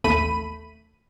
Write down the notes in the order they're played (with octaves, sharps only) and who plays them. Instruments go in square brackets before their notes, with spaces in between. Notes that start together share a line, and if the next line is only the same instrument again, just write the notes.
[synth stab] A1 D#2 A3 B5 D#7